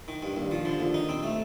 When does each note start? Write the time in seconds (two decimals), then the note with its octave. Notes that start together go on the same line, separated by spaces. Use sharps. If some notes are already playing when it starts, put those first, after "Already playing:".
0.08 D#3
0.23 G2
0.36 D#2
0.51 F3
0.65 D3
0.80 D#2
0.94 D#4
1.09 C4
1.23 A3